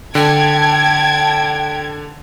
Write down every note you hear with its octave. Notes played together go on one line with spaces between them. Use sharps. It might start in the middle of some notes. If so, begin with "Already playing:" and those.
D3 G5 A5 G#6